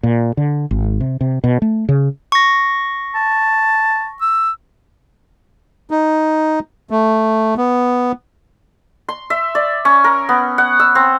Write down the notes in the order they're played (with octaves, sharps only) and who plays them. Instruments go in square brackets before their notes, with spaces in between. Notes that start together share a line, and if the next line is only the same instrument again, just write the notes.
[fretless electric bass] A#2
D3
G#1
C3
C3
B2
A3
C#3
[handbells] C#6 A#6
[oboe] A5
E6
[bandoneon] D#4
A3
B3
[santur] C6
E5
D5
C#4
A#4
B3
F#5
E6
C4